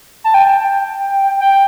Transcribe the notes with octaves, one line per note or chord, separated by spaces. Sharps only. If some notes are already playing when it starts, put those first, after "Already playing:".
A5
G5
G5